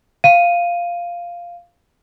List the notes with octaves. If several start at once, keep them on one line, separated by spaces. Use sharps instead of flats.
F5 D#7